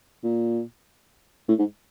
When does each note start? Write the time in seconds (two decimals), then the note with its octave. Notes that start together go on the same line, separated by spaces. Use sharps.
0.24 A#2
1.48 A2
1.59 G#2